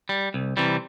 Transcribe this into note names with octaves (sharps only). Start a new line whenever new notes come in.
G3
C2
C3 E3 G3